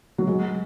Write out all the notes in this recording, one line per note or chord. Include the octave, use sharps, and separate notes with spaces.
F#3
G#3